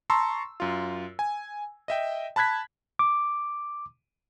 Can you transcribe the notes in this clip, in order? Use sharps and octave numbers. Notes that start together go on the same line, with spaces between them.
A5 A#5 C6 C#6 E6
F#2 F4
G#5
D#5 E5 G5
A5 B5 F#6 G#6 B6
D6